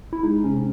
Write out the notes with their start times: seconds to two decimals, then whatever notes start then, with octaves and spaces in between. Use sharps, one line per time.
0.13 E4
0.23 G#3 D#4
0.43 C3 C#4